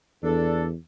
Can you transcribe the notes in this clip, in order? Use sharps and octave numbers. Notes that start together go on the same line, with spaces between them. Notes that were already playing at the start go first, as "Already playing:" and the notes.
E2 D4 A4